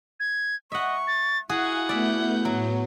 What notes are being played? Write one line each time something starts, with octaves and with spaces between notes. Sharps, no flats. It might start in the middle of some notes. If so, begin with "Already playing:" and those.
G#6
D#5 E5 F#5 C#6
A6
E4 F#4 G#4 F5 F#5 G#5 G#6
A3 B3 D5 E5 G6
A2 F#3 B3